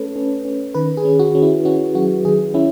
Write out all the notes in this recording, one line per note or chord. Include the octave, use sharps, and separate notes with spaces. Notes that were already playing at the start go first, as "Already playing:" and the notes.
Already playing: A3 C#4 A4 B4
C#4
C#4
D#3 B4
G#4
C#4
F#4
C#4
E4
C#4 F#4
F#3 F#4
D#3 G#4
C#4 E4